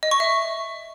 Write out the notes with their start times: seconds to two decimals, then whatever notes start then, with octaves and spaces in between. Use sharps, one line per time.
0.03 D#5
0.11 C#6
0.20 E5